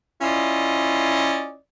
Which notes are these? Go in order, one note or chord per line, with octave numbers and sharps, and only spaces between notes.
C#4 E4 F4 D5 D#5